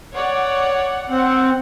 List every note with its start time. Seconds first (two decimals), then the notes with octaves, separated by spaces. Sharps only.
0.13 C#5 D5 F#5
1.09 C4 F#5